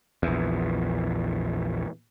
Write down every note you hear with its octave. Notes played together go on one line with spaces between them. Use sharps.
A#1 E2